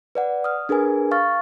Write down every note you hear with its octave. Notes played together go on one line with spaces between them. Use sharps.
B4 D5 F#5
D#6 F6
D4 G#4 A#4 B4 G#5
F5 C#6 F6 A6